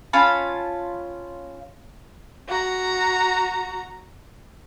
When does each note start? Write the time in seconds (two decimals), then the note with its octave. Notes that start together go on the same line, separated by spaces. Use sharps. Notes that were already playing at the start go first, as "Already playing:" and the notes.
0.13 C#4 F4 A5 B5
2.48 F#4 A#5